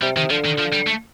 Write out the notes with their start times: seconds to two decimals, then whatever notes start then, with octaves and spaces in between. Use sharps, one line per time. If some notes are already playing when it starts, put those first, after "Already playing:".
0.02 C3 G3
0.16 C3 D#3
0.30 D3 F3
0.45 D#3
0.58 F3
0.72 G3
0.87 A3